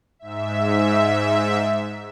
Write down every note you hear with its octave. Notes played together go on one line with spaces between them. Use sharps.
G#2 E5